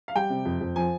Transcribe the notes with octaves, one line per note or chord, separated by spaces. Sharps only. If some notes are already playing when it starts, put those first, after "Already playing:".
F5
G3 G5
C3
F2
F2
F3 G#5